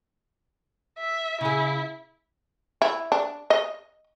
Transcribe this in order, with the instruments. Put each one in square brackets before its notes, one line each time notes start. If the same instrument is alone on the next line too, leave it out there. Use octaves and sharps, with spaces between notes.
[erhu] E5
[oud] C#3 G#4 [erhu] E4
[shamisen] E4
D4
D#5